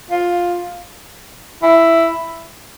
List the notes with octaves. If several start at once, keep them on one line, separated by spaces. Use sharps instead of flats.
F4
E4